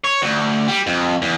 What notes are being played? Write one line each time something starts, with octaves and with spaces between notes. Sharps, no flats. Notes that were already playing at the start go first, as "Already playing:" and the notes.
C#5
D2
G3
F2
E2